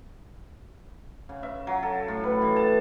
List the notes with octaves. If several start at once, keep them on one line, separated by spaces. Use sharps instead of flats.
C#3
E5
F#3
A4
A2
B4
E3
A5